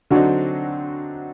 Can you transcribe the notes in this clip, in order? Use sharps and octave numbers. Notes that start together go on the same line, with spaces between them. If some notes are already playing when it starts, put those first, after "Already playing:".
D3 F#3 C4 D4 D#4 F#4